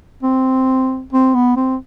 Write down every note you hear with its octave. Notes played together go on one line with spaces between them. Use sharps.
C4
C4
B3
C4